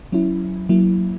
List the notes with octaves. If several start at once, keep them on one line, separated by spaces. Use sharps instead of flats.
F#3 C#4 E4
F#3 A#3 E4